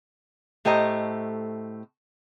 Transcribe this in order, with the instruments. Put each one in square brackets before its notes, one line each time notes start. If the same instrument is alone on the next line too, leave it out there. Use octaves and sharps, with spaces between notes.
[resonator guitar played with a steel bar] A2 A3 G4 C5 D#5 A#5